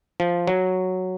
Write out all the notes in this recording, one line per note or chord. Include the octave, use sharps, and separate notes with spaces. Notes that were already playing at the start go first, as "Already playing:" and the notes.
F3
F#3